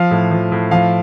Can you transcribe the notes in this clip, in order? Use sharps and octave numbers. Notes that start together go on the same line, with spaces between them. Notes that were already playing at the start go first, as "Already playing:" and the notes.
Already playing: F3 F5
A2
F3
A2
F3 F5